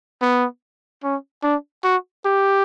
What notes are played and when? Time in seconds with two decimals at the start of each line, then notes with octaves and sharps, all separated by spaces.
0.22 B3
1.04 C#4
1.43 D4
1.84 F#4
2.25 G4